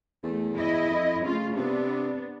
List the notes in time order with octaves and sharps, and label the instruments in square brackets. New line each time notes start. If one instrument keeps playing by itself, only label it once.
[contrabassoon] E2 [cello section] A3
[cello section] E4 D#5
[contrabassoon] F2
[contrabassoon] C#3 [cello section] A3 F4
[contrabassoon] C3 [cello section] B3 D4